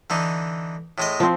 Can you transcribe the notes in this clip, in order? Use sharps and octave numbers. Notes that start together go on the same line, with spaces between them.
D3 E3 D#4
A2 G#3 D#5
F3 C4